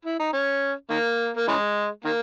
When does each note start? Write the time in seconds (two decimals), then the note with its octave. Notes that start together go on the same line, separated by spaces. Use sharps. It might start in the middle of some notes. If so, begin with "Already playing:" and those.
0.05 E4
0.19 D#4
0.33 C#4
0.90 D#3 A#3
1.36 A#3
1.48 C#3 E3 G#3
2.05 D#3 A#3